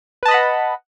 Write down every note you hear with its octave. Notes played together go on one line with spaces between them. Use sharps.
B4 D#5 F#5 A5 B5